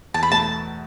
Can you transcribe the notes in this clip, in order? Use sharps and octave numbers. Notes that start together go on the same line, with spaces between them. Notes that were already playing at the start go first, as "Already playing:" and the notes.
E2 A5
B5
B2 A3 A5